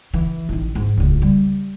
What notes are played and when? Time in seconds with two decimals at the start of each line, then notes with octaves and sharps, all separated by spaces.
0.14 E3
0.49 A1 D#3
0.75 G#2
0.97 D1 C#2
1.22 G3